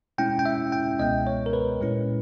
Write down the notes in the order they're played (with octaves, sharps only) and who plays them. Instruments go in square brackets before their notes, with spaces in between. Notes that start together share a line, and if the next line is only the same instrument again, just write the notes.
[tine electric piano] B2 G#3 C#4 E4 G5
G5
E5
G5
C#2 B2 G#3 B3 D#5
C#5
A#4
B4
A#2 G#3 C#4 E4